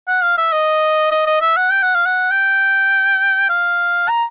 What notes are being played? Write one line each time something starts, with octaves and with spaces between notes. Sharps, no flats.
F#5
F5
E5
D#5
D#5
D#5
E5
F#5
G5
F#5
F5
F#5
G5
F5
A#5